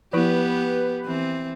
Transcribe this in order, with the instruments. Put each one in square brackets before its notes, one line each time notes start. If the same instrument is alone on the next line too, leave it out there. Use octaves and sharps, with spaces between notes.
[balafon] F3 E4 [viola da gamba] B3 G4 [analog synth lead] B4
[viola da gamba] E3 C4